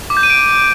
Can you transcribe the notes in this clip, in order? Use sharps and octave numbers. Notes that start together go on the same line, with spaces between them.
D6
G6
D#7
D7